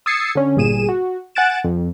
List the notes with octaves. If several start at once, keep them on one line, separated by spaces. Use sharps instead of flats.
D#6 E6 G#6 A6 C7 C#7
D3 C#4
G1 G2 A#2 G#4 D#7 E7
F#4
F#5 G#5 F#6 A6 D7 E7
F2